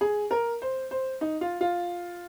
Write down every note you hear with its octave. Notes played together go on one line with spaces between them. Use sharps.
G#4
A#4
C5
C5
D#4
F4
F4